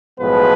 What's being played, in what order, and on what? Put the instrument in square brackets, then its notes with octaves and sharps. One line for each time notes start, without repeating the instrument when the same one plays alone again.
[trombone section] B1 A2 F3 G#3 B3 B4